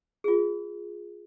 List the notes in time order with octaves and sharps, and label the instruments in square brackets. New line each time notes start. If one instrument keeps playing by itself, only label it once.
[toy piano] F4 G#4